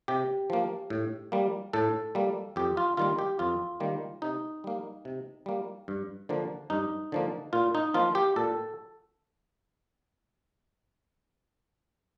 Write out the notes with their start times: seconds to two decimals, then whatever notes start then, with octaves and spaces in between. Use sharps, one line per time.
0.08 C3 G4
0.50 F3 A#3
0.90 A2
1.32 G3 A#3
1.73 A2 A4
2.15 G3 A#3
2.56 F2 G4
2.77 F4
2.97 D#3 G3 A#3 F4
3.19 G4
3.39 F2 F4
3.80 D#3 G3 A#3
4.22 C3 D#4
4.64 G3 A#3
5.05 C3
5.46 G3 A#3
5.88 G2
6.29 D3 F3 A#3
6.70 G2 D#4
7.12 D3 F3 A#3
7.53 A#2 F4
7.75 D#4
7.94 F3 A#3 F4
8.15 G4
8.36 A#2 A4